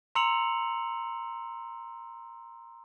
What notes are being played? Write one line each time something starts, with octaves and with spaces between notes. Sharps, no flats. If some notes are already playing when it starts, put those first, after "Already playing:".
A#5 C6 E6 C#7 F7 F#7